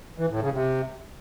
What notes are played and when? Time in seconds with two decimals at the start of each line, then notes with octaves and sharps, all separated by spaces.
0.18 E3
0.30 A2
0.41 C#3
0.53 C3